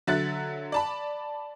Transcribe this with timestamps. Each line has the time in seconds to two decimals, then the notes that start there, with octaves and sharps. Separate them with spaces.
0.07 D3 F#3 E5 F#6 A6
0.72 D5 A5 B5